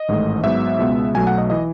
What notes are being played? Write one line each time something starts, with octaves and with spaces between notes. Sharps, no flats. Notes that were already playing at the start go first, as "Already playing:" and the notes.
Already playing: D#5
A1 G#2 D#3 A3
G#2 F#3 B3 E5
C#2 B2 G#3 B3
B1 B2 F#3 A3 G#5
F#5
D#5
E3 D#5